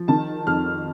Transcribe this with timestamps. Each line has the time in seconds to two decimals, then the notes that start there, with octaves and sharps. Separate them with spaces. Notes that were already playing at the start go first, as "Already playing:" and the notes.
Already playing: F3
0.08 D#3 A5
0.47 F2 F6